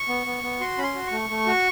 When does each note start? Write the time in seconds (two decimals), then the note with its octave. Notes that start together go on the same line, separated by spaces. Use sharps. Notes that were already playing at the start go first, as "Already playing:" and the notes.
Already playing: C#6
0.08 B3
0.26 B3
0.44 B3
0.60 F#4 C6
0.78 C#4 B5
0.83 C6
0.95 F#4
1.07 C#6
1.12 A3
1.30 A3
1.46 F#4